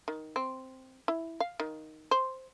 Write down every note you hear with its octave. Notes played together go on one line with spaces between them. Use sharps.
D#3
C4
E4
F5
D#3
C5